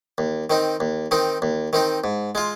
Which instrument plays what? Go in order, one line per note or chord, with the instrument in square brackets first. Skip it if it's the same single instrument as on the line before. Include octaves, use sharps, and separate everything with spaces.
[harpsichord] D#2
D#3 C4 D#4
D#2
D#3 C4 D#4
D#2
D#3 C4 D#4
G#2
G#3 F4